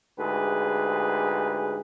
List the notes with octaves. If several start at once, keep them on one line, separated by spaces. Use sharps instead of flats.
D2 G#2 G4 G#4 B4